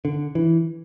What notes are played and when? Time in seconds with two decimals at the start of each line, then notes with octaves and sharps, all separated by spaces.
0.05 D3
0.35 E3